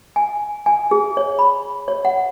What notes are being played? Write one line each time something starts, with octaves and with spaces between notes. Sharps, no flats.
G#5
G#5
G#4
C#5
B5
C#5
F#5